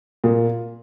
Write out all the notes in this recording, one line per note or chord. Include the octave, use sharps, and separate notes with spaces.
A#2